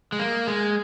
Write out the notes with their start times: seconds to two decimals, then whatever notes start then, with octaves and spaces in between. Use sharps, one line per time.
0.12 G#3
0.19 A#3
0.47 G#3